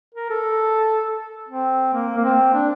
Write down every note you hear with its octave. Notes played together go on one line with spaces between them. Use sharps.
A#4
A4
C4
A#3
A#3
C4
D4